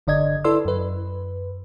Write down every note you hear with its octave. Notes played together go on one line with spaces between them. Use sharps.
G1 D3 D5 D#5 G#6
E4 A4 B4 D5 C6 E6
F#2 B4